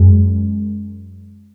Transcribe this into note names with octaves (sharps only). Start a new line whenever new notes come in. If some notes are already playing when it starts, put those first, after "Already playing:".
Already playing: F#2 G#3